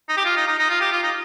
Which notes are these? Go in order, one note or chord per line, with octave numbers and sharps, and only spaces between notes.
D#4
G4
F4
D#4
D#4
D#4
F4
G4
F4
D#4